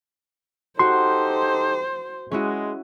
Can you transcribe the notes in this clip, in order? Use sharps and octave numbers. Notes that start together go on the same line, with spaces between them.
D#4 F#4 G4 A4 C5 C6
G#3 C#4 E4 F#4